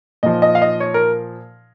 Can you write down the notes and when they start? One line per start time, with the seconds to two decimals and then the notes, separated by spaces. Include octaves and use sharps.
0.23 A#2 F3 D#5
0.42 D#5
0.55 F5
0.62 D#5
0.80 C#5
0.94 A#4